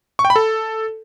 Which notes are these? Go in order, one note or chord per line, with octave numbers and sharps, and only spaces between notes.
C#6
G5
B5
A4